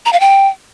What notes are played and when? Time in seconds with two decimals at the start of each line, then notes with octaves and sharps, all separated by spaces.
0.06 A#5
0.13 F5
0.20 G5